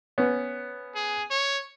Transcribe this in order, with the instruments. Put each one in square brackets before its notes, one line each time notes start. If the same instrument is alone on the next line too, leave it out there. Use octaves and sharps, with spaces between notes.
[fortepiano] B3 C#4
[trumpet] G#4
C#5